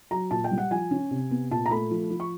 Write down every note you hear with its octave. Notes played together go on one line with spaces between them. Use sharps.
F#3 A#5
A#2 A5
G5
G3
F#5
F3 G#5
C#4
C3
B3
A#2 A5
A#5
A3 B5
F3
F3
C#6